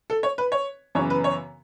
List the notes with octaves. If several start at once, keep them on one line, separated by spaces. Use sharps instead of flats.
A4
C#5
B4
C#5
F#2 C#3 E3 B3 C#5
B4
C#5